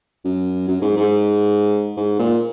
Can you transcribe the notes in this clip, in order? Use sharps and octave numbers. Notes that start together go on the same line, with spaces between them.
F#2
F#2
G#2
G#2
G#2
A#2